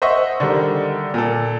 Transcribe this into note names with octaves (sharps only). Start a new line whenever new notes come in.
C5 D#5 E5 F#5 C#6
D3 D#3 G3
A#2 A4